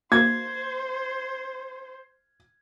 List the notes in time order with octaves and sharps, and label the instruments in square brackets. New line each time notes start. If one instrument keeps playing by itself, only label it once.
[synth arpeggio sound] A#3 [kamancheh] C5 [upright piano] G#6